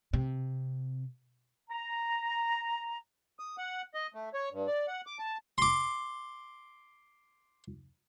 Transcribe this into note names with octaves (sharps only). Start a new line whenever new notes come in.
C3
A#5
D#6
F#5
D#5
A3
C#5
G2
D5
F#5
D6
A5
C6 D6